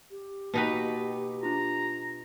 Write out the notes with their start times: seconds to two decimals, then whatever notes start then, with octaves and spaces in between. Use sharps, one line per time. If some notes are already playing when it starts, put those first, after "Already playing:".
0.10 G4
0.54 B2 A#3 D#4 F#4 B4 G5
1.43 D4 F4 A#5